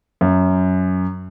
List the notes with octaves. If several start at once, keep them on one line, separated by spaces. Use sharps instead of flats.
F#2